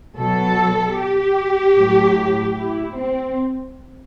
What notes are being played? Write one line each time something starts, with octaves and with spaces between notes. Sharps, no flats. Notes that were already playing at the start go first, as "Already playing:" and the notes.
B2 F#3 A4
G4
A2 F#3
E4
C4